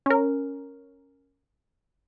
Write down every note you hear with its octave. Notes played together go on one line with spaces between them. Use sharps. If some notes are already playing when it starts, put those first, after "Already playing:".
C#4 A#4